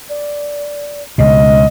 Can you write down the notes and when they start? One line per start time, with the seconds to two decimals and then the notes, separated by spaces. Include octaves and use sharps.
0.09 D5
1.18 C#2 B2 D#5